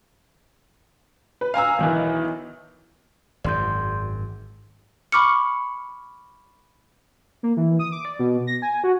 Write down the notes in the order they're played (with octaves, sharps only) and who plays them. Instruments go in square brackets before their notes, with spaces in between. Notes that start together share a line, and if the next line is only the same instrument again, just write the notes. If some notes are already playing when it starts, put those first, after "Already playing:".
[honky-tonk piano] B4
F5 G#5 A#5 E6
B1 D#3 E3
[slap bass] G#1 F#2 [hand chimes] D5 C6 G6
[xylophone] B5 C#6 D6 F6 C#7
[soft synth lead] A#3
E3
D#6
D6
D5
B2
A#6
G#5
F#4